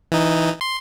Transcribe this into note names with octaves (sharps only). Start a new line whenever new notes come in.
E3 D#4
C6